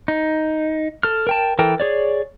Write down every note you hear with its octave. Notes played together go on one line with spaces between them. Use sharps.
D#4
A4 F6
A#4 G5 A5
E3 A4 A#4 G5
G#4 C#5 D5